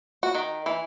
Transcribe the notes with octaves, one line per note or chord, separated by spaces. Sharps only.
F#4
D#3
E3